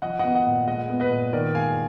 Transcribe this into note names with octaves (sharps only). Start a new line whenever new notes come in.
F3 D#5 F#5
B3 D#5 F#5
D#5 F#5
A#2
G#3 D#5 F#5
B3
B4 D#5
A#2
D#3 A#4 D5
G#3 F5 G#5